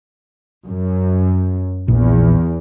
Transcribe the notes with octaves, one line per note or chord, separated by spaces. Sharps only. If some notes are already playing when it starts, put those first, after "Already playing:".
F#2
A#1 E2